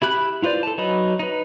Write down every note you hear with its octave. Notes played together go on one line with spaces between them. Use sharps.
E4 G4 B5 F#6
E4 F4 B4 C5 D5
A4 A5
F#3 D#4 B4 D#5 B5
D#4 B4